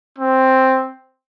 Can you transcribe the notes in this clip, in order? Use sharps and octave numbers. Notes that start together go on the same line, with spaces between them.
C4